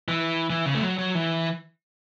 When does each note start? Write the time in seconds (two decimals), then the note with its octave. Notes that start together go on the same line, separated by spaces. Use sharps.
0.08 E3
0.50 E3
0.66 C#3
0.75 A3
0.82 F#3
0.99 F#3
1.15 E3